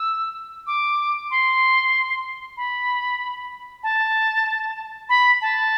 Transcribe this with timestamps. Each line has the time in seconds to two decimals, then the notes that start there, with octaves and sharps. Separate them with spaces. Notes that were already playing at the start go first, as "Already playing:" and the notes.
Already playing: E6
0.67 D6
1.31 C6
2.57 B5
3.83 A5
5.09 B5
5.42 A5